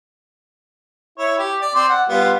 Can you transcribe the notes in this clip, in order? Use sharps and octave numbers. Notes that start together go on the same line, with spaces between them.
E4 C#5
G4
D5
C4 C5 D5
F#5
G3 B3 F4